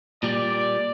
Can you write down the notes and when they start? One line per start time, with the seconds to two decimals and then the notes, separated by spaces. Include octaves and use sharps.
0.23 A#2 G3 D5